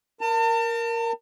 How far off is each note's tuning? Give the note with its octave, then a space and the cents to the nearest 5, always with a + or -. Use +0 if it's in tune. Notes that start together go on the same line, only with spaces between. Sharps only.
A#4 +0 A5 +40